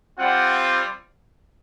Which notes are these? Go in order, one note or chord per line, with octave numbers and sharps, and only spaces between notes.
G3 C4 F4 F#5